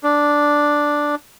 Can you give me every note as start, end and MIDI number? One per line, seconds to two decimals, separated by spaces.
0.03 1.15 62